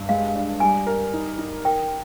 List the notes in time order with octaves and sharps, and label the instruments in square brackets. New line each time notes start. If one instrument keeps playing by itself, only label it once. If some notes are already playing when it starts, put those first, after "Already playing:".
Already playing: [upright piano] G2
[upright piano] G#3 [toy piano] F5
[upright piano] D4
[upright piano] G3 [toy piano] G#5
[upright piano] A#4
D#4
D#4
[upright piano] A#4 [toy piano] G5